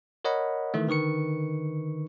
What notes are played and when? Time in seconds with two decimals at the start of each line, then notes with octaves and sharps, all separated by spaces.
0.25 A#4 C#5 D#5 F#5 B5
0.74 D#3 E3 A3
0.87 D3 D#3 B4 C#6 C#7